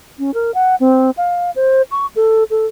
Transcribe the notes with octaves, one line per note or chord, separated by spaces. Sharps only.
C#4
A#4
F#5
C4
F5
C5
C#6
A4
A4